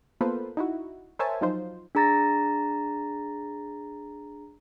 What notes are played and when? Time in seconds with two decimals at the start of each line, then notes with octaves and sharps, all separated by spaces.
0.21 A#3 B3 F4 A4 B4 C5
0.57 D#4 E4 F#4
1.19 A#4 C5 C#5 E5 G#5 A5
1.41 F3 F#3 D#4 F4 C5
1.95 D4 G#4 A#5 A6 A#6